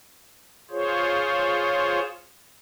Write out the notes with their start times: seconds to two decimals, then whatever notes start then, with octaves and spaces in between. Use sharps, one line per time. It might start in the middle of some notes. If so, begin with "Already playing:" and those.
0.70 F4 G#4 C5 C#5